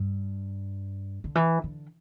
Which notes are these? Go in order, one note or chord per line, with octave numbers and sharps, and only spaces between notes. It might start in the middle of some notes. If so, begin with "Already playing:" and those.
Already playing: G2
D3
E3
D3